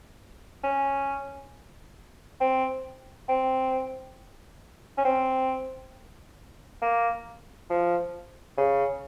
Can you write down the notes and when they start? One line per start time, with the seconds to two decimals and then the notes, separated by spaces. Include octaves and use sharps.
0.64 C#4
2.41 C4
3.29 C4
4.98 C#4
5.05 C4
6.82 A#3
7.70 F3
8.58 C#3